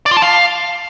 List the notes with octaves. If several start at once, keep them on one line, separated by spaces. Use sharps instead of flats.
D5
F4
A5
F5